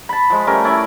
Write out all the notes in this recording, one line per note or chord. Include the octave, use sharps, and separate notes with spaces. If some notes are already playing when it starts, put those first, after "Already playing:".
A5 B5
F3 G#3
G3 A3 C#4 A#4
C#4 E4 D5 E5